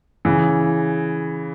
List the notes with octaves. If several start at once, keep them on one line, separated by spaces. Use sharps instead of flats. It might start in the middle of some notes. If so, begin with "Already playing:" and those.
C#3 E3